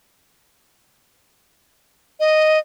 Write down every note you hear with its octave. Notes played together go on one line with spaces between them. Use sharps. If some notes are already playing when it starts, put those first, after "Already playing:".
D#5